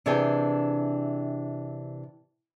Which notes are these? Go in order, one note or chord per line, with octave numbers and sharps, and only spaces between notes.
C3 E3 D4 G#4 G5 G#5